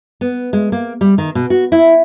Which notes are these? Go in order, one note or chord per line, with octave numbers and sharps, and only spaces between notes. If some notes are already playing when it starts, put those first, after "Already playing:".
B3
G#3
A#3
G3
D#3
B2
F#4
E4